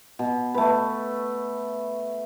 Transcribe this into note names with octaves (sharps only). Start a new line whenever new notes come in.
B2
A3 B4